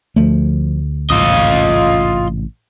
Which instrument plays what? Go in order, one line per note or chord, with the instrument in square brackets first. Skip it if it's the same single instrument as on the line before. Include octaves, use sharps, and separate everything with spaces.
[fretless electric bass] D2 A3 [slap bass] F3
[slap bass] A1 G#2 C3 [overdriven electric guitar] F4 D#5